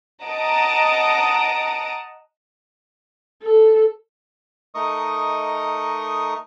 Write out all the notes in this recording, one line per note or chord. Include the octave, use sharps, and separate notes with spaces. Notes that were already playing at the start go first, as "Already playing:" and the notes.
D#5 F#5 A5 A#5 D#6 D7
A4
A3 D#4 A#4 D#5 C#6 D#6